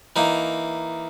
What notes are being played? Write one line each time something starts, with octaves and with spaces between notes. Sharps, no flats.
E3 A#3 D#4